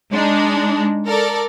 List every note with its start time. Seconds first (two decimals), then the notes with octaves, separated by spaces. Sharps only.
0.12 G#3 D4 D#4
1.07 A4 A#4 D5